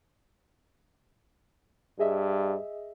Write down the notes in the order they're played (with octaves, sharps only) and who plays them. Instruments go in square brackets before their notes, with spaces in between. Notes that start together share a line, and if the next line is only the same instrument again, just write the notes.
[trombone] G2 [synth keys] G#4 D#5 E5